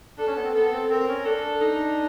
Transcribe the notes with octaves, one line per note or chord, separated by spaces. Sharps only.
D4 A4
C#4
B3
C4
B3 A4
C4
C4 A#4
C#4
D4 A4
D#4